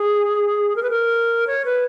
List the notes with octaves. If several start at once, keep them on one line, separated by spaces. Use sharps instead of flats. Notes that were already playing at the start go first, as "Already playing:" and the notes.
Already playing: G#4
A#4
B4
A#4
C#5
B4